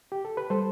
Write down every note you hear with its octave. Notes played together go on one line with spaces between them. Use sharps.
G4
A4
B4
G3 A4 C5